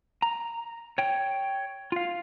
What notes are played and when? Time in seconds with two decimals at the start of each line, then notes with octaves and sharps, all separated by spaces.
0.22 A#5
0.98 C#5 G5
1.92 F4 F5